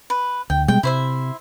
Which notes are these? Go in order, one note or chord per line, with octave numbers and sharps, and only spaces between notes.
B4
D2 G5
B2 G3 G#3 G5
C3 E4 C5 E5